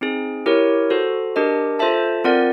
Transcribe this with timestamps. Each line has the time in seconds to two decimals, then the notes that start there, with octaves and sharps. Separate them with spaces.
0.01 C4 D#4 G#4
0.46 E4 G4 A#4 C#5
0.90 F#4 A4 C5
1.36 D4 G4 A#4 D#5
1.79 F4 A4 C5 E5 A5
2.24 C4 F4 A#4 D5 F#5